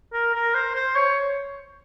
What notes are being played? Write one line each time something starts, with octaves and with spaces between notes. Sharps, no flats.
A#4
A#4
C5
C5
C#5